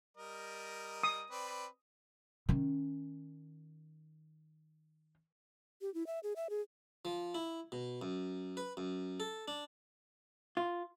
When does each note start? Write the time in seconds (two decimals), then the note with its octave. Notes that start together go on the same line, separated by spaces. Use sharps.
0.17 G3 A#4 D#5
1.03 D#6
1.30 C4 B4 D5
2.49 D#3 C#4
5.81 G4
5.94 E4
6.07 E5
6.23 G#4
6.36 E5
6.50 G#4
7.05 F3
7.35 E4
7.72 B2
8.02 F#2
8.57 B4
8.77 F#2
9.20 A4
9.48 D4
10.57 F4